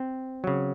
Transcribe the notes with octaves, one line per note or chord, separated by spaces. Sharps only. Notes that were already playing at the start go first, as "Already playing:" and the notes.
Already playing: C4
C#3 F#3